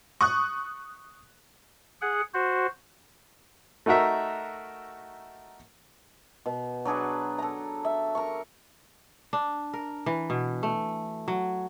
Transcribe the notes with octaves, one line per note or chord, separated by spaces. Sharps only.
C#6 D#6 F#6
G#4 F#5
F#4 C5
A3 D#4 F#4 A#4 E5
B2
F#3 D4 G#4 B4
A4 A#5
E5
A#4 C#6
D4
A#4
E3
B2
A3
F#3